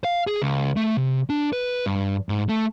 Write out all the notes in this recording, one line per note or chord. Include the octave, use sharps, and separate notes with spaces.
F5
G#4
C#2
A3
C3
D4
B4
G2
G#2
A3